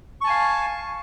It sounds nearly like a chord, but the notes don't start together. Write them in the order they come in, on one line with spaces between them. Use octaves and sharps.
C#6 A5 G#5 F5